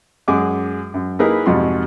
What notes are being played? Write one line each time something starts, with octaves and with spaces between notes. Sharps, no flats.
F#2 G#3 F#5 G#5 D6 D#6
F#2
A#3 D#4 E4 G#4 A#4 B4
F2 G#2 C3 F4 F#4 C6